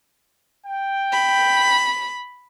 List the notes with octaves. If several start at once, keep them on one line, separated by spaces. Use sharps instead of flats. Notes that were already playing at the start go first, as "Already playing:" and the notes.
G5
B5